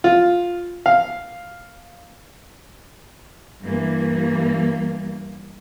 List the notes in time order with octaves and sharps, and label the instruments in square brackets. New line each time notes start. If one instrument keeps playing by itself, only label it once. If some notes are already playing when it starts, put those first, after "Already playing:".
[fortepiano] F4
F5
[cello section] G2 E3 A#3